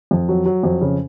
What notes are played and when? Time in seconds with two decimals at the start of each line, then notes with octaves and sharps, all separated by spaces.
0.11 F2
0.29 F#3
0.46 F#3
0.63 F2
0.82 C#3